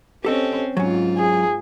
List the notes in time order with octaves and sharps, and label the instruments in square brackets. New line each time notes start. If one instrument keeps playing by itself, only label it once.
[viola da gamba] C4 C#4 [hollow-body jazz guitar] G4 A4 D#5
[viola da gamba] G#2 F4 [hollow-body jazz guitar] F#3 C#4
[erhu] G#4